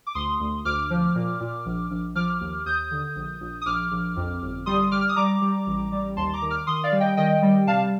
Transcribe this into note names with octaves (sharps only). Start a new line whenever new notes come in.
D6
D2 C6 D#6
D2
D2 D6 F6
F3
A#2
A#2
A#1
A#1
F3 D6 F6
D#2
D#2 D#6 G6
D3
A#1
A#1
D#6
A#1 D6 F6
A#1
F2
G1
G3 C6 D#6
G3 D6 F6
F6
D#6
G3 A#5 D6
G3
A1
G3
D#2 A5 C6
A#5 D6
D#3
D6 F6
D#3 C6 D#6
D5 F5
G3
D#5 G5
D#3 D#5 G5
G3
C3 F5 A5